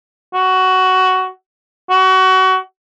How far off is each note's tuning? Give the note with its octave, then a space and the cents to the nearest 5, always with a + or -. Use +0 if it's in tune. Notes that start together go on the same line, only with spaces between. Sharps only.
F#4 +10
F#4 +25